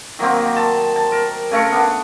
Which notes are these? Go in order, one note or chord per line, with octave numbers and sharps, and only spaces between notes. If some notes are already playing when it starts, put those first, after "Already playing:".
D#3 F#3 A#3 C4
A5
A5
A#4
C#3 A3 A#4 C#6
B3 D4